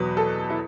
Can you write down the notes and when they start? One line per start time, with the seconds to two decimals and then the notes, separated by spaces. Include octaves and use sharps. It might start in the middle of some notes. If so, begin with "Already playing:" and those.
Already playing: E2 B2 F#3 B4
0.17 A4
0.50 E4